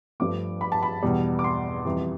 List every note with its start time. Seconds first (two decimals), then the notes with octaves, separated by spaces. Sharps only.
0.20 G2 F3 A3 D6
0.61 B5
0.72 A5
0.83 B5
1.02 E2 B2 G3
1.39 D6
1.44 C6
1.85 F2 E3 G3